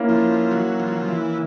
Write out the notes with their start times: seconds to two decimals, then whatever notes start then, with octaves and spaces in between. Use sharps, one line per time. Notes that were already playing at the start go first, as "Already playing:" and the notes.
Already playing: A#3 C#4 E4
0.09 F3
0.51 F#3
0.80 F3
0.88 F#3
0.98 F3
1.08 E3